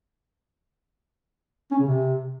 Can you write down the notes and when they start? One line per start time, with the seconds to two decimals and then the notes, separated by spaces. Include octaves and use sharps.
1.72 C#4
1.79 C#3
1.87 C3